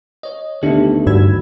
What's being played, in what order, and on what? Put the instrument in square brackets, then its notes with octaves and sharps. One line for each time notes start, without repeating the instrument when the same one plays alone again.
[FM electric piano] C#5 D#5
[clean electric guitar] D2 D#3 [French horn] A3 [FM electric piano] B3 D4 G4
[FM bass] G2 [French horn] F#4 [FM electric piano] B5 E6 G#6